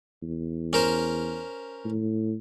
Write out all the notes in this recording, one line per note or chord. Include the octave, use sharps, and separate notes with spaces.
E2
C#4 A#4 C5
A2